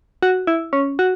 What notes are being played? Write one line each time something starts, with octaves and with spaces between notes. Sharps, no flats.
F#4
E4
C#4
F#4